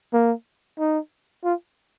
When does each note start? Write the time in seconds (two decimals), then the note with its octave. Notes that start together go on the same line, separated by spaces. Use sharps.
0.13 A#3
0.79 D#4
1.44 F4